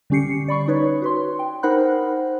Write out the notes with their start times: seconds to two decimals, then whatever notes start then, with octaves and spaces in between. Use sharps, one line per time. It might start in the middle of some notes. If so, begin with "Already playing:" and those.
0.10 D3 G3 C#4 G4 C7 C#7
0.48 D5 B5 C#6
0.68 D#4 B4 C#5
1.02 F#4 B4 C6
1.39 G5
1.63 D#4 A#4 C5 F#5 B5 F#6